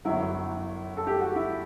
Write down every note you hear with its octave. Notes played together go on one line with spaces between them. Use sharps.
G1 F#2 F#3 E4
A4
G4
F#4
E4